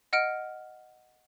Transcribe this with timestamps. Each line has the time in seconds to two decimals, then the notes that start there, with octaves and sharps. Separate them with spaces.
0.13 D#5 F#5 F6 D7